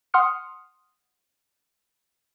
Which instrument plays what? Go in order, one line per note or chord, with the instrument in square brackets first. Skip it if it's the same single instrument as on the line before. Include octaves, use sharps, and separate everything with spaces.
[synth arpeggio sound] F#5 C6 D#6 F6 C#7